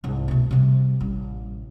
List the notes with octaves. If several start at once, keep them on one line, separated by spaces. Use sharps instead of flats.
C2 G#2
B2 A3
C3 G3
A1 G3